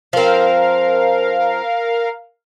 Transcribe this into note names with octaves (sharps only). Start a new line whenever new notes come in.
F3 C4 A#4 F5